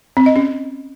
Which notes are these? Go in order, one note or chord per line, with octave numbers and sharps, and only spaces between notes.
C4
D#5
C#4